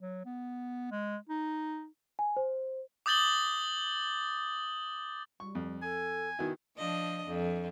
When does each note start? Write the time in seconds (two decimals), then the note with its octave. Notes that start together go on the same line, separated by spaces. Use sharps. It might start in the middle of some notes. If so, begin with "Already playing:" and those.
0.01 F#3
0.25 B3
0.91 G#3
1.29 D#4
2.19 G#5
2.37 C5
3.06 D6 D#6 G6 A6 F#7 G7
5.40 G3 C#6
5.55 F2
5.82 A4 G#5
6.39 D#3 B3 E4 F#4
6.77 F3 D4 D#5
7.28 F2